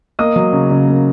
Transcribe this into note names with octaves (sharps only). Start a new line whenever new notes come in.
A#3 D#5 D#6
F#3
C#3
C#3
A#3